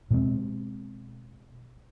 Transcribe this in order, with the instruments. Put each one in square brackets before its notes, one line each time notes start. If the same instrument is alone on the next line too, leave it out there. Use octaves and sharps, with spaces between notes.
[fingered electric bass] B2 G#3 B3 C4